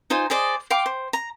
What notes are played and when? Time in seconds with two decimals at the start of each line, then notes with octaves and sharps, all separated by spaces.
0.10 D#4 F4 C5 G#5
0.30 G#4 C5 D5 D#5
0.71 F5 G5 C6 D6
0.86 C5
1.13 A#5